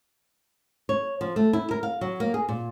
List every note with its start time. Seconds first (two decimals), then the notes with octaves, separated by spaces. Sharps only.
0.89 C#5
1.21 F3
1.36 A3
1.53 E4
1.71 A#4
1.83 F5
2.01 F#3
2.20 A#3
2.34 G#4
2.49 A#2